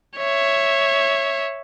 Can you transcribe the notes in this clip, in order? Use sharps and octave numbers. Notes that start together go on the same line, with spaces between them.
C#5 E5